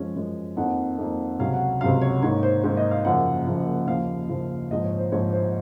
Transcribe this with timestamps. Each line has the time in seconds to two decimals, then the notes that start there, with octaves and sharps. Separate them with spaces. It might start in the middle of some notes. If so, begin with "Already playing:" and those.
Already playing: F#2 F3 G#3 C#4
0.15 F#2 F3 G#3 C#4
0.57 F2 D#3 A#3 F#5
0.98 F2 D#3 A#3
1.39 C#2 C3 F#3 C#4 F5
1.53 F#5
1.81 C#2 C3 F#3 C#4 F5
2.01 C#5
2.22 G#2 D#3 A#3 C#5
2.43 C5
2.64 G#2 D#3 A#3 C5
2.77 D#5
2.91 F5
3.05 F#1 F#2 C#3 F3 A#3 F#5
3.46 F#1 F#2 C#3 F3 A#3
3.88 D#2 C#3 F3 F5
4.29 D#2 C#3 F3
4.71 A#1 G#2 F3 D#5
4.84 C#5
4.98 C5
5.12 A#1 G#2 F3 C#5
5.33 C5